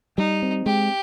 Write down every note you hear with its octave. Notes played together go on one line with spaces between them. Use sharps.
G3 D#4
C4
G#3 G4